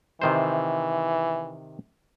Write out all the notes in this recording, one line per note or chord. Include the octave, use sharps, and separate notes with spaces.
C3 D#3 E3 C5